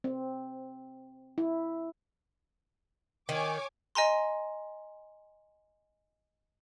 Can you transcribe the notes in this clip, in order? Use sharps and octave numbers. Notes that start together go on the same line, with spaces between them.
C4
E4
D#3 C#5 G#5 D6
D#5 G#5 A#5 C6